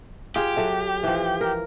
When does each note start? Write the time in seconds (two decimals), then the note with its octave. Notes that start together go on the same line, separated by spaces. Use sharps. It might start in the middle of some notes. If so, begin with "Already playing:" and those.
0.36 F4 G4 G#4
0.57 F#3 A4 E5
1.03 E3 F3
1.41 A#4